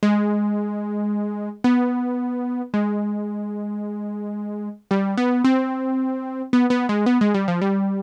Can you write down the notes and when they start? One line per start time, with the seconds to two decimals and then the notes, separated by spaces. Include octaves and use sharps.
0.03 G#3
1.64 B3
2.74 G#3
4.91 G3
5.18 B3
5.44 C4
6.53 B3
6.70 B3
6.89 G#3
7.06 B3
7.21 G#3
7.34 G3
7.48 F3
7.61 G3